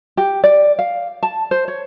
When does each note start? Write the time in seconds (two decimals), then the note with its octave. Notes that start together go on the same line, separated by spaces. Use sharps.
0.17 G4
0.44 D5
0.79 F5
1.23 A5
1.51 C5
1.68 C#5